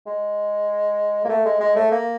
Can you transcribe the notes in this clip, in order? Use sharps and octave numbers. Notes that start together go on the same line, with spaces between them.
G#3
A#3
A3
G#3
G#3
A3
A#3